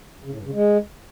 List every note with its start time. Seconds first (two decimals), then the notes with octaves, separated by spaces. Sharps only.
0.24 C#3
0.31 A2
0.39 G2
0.46 C#3
0.53 G#3